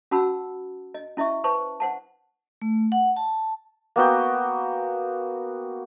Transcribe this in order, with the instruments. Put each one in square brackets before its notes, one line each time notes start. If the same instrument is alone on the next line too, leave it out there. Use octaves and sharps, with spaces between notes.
[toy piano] C#4 F#4 F#5 A5 B5 E6
D#5
C#4 E4 D#5 E5 C#6
B4 C5 A5 C#6
C5 F#5 A5
[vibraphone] A3
F#5
A5
[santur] A#3 B3 F#4 G5